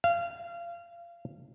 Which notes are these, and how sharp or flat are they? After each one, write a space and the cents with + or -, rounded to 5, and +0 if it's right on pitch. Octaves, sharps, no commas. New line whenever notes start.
F5 -25